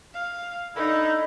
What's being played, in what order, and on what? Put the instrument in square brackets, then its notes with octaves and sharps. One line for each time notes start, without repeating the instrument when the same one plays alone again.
[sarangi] F5
[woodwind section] D3 E4 [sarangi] D#4